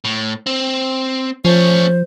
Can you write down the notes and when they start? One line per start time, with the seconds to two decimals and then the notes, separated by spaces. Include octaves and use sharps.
0.04 A2
0.46 C4
1.45 F3 A3 C#4 C5